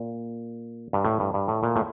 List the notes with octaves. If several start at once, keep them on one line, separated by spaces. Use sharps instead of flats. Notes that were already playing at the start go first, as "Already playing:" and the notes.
Already playing: A#2
G2
A2
G2
G2
A2
A#2
A2